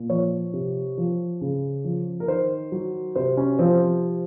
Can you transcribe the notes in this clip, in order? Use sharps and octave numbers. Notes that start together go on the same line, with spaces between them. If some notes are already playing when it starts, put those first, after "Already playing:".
Already playing: A#2
F3 C#5
C3
F3
C#3
F3
A#4
D#3 C5
F#3
C3 C5
C#4
F3 C4